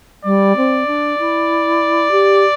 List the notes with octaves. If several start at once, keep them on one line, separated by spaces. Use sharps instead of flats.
G3 D5
C4
D4
E4
G4